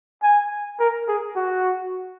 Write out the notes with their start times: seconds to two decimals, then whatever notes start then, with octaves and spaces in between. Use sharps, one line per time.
0.23 G#5
0.80 A#4
1.08 G#4
1.36 F#4